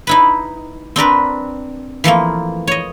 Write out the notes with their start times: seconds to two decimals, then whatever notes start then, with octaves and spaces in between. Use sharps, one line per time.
0.07 D#4 E4 B4
0.96 C4 D4 A#4 B4
2.04 E3 F3 A3 A#3
2.67 C#5 D#5